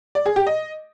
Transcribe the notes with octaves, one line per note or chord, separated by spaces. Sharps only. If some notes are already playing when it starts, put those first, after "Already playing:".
D5
G#4
G4
D#5